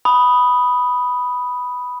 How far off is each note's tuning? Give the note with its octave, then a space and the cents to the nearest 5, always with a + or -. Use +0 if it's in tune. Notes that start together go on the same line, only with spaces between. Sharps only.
B5 +0 D#6 +0